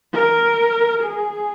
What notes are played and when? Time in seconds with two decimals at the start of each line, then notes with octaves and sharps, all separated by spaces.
0.14 A#4
1.04 G#4